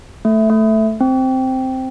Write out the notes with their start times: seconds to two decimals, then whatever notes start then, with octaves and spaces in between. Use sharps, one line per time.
0.25 A3
0.50 A3
1.00 C4